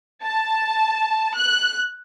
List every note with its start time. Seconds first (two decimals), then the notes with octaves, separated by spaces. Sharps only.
0.23 A5
1.35 F#6